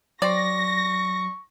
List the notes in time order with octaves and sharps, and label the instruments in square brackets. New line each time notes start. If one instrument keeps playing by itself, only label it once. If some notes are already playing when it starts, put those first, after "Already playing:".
[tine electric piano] F#3 [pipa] C4 D5 [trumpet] C#6 [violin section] A#6